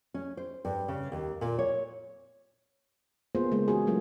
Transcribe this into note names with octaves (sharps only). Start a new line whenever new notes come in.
C#4
C5
G2
C#3
D#2
A#2
C#5
A#3 B3 F4 G#4 C5
C#3 G#3 A#3
E3 C#4 F#4 G#4
F#3 A3 A#3 F4 A4